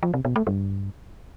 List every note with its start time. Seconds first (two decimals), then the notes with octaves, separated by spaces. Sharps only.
0.03 F3
0.14 C3
0.25 B2
0.36 A3
0.47 G2